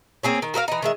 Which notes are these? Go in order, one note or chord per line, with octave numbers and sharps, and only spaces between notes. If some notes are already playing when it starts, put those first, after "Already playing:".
A#3 C4 G#4 C#5
D#3
F#4 A#4 D#5 F5
E3 D#4
D#3 G#3 E5